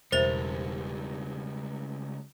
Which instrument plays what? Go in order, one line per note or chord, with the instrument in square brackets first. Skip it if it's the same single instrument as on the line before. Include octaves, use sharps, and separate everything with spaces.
[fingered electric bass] E1 [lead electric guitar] C#2 G3 [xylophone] A#4 A6 F7 [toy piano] C5 E5